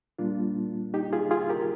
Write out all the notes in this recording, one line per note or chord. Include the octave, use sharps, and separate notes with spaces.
A#2 G3 A#3 D4 F4
D#4 G4
F4 G#4
F4 G#4
G4 A#4